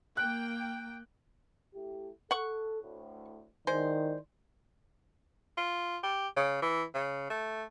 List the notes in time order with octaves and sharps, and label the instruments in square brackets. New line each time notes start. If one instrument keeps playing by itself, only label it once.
[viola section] A#3 G5 [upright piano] F#6
[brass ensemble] A3 E4 G4
[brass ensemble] A4 [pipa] F#5 C#6
[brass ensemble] D2 A2
[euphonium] D#3 [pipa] G#3 C5 [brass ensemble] E4 D5
[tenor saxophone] F4
G4
C#3
E3
C#3
A3